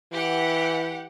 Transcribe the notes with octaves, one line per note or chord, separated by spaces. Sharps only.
E3 G4 F#5